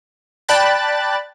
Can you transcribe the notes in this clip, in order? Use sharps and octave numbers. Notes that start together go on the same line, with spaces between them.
D5 G5 A5 B5 F#6 A6